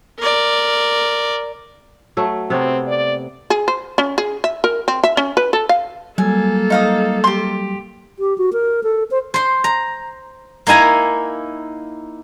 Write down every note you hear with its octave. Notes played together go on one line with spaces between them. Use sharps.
A#4 D5
F#3 A3
C3 B3 C4 C#5
D5
G#4
C5
C#4
G#4
E5
A#4
C4
E5
C#4
B4
A4
F5
F#3 G3 A#3 A4 G#5
D#4 F5 D#6
G4 C6
G4
F#4
A#4
A4
C5
C5 C6
A#5
A#3 D#4 E4 G#5 A#5